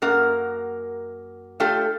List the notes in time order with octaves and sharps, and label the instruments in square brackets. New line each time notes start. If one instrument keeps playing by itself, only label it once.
[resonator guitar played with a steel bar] F#2 A#3 A#4 F#5
A3 D4 F4 G4 A4